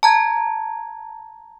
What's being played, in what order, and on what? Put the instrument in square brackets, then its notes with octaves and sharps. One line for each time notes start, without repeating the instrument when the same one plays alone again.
[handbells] A5 A#5 G#6